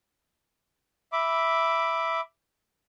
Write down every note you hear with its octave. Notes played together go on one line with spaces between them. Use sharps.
E5 B5 D6